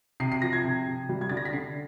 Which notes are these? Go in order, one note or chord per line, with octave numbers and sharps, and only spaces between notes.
C3 C7
C7
F3 A#6
G#6
C3
C3
G3
G#6
D3 A6
A#6
B6
D3 C7